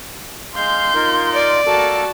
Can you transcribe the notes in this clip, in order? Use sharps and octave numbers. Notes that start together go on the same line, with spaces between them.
G#3 F5 C6 G6
D#4 F4 A#4
D5
A#3 F#4 A4 A#4 A5